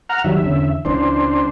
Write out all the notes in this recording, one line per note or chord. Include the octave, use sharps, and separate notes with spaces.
F#5 A#5 F6
D#3 F#3 G3 E5
E2 D3 C#4
C#2 C#3 E3 D4 C5